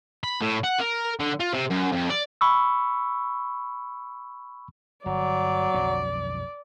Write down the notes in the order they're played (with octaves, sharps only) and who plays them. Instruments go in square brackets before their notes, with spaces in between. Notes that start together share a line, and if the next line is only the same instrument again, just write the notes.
[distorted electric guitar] B5
A2
F#5
A#4
D3
F4
C3
F#2
F2
D5
[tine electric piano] B5 C#6 E6
[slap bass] G1 [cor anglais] F#3 [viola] D5
[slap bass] B1 F2 D3